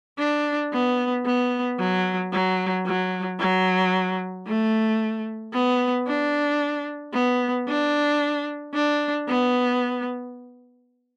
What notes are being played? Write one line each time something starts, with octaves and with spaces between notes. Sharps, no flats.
D4
B3
B3
F#3
F#3
F#3
F#3
A3
B3
D4
B3
D4
D4
B3